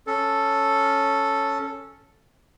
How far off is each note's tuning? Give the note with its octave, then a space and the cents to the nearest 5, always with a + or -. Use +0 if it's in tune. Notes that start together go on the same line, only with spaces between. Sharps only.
C#4 +0 A4 +0